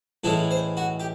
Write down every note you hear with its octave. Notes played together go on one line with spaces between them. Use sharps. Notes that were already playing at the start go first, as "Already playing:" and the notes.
A2 E3 G#3 C#4 E4 A4
C5
F#4
G4